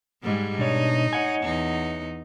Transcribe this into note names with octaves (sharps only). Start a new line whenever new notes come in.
G#2 G3 G#3
B2 D4 D#4 C#5
C#5 F#5 G#5
E2 D#4